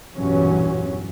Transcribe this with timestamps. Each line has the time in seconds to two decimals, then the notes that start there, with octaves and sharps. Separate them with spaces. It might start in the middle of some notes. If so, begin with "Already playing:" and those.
0.15 B1 E2 G2 A#2 F#3 C#4